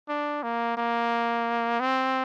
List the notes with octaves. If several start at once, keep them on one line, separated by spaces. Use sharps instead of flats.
D4
A#3
A#3
C4